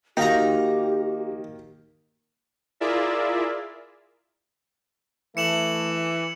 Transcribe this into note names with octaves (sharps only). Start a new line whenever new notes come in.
D#3 A#3 D#4 F#4 G4 F5 G5 A#5
E4 F4 G#4 A#4 D5 E5
E3 A3 C#7 E7 F#7